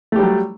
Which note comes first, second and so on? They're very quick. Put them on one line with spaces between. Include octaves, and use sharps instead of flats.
A3 G4 G3 F#3